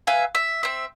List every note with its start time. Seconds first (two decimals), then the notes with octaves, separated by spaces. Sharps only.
0.07 B4 E5 F5 G#5
0.35 E5
0.63 C4 E5